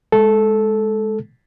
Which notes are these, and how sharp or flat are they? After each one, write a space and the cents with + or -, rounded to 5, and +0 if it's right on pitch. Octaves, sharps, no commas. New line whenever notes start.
G#3 +0 A4 -10